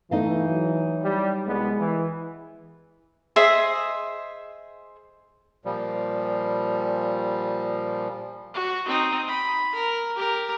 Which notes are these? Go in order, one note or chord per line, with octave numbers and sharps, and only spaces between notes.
E3 A3 D#4 D#5 F5
F#3
G3
C2 G#3 B3
E3
G#4 C5 D#5 E5
A#2 F3 G3
F#4
C4 D#4
B5
A#4
G4 A#4